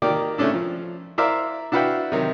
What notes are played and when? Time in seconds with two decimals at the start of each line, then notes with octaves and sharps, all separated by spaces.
0.02 D#3 A#3 G4 A#4 D5
0.38 C#3 A3 C#4 D4 E4
0.54 F3
1.18 E4 A#4 C5 D5 E5 F5
1.72 D4 E4 F#4 B4 F5 G5
2.12 C3 D#3 F#3